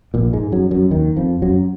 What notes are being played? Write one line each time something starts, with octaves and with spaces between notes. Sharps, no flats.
A#1 A#2
G#2 G#3
F#2 F#3
F#2 F#3
D#2 D#3
F2 F3
F#2 F#3